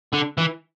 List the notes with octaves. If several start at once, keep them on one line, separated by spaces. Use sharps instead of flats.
D3
E3